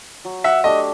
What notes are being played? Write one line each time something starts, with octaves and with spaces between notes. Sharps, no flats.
F#3
E5 F#5
A3 D4 G4 D#5